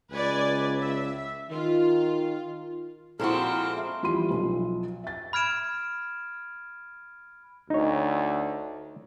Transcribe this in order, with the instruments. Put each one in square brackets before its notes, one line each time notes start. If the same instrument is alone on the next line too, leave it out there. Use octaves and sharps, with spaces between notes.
[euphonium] C#2 [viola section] B4 D5 G#5
[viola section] E5
[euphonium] D#3 [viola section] F4
[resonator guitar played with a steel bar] A#2 F3 F#4 [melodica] G#3 A#4 [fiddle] C4 [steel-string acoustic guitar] E4 A4
[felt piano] E3 F3 G3 B5 C6 D#7
B1 F3
E5 A6
[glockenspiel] B5 F6 G#6 D7 E7
[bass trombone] D2 [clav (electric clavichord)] D#4 C#5